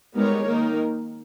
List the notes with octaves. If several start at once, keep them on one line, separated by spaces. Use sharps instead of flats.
G3 G#3 B3 D#4 A#4 C#5
D#3 A#3 D#4 A#4